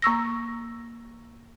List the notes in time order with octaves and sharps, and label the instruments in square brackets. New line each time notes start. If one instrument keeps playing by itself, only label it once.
[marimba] A#3 C#6 E6 A#6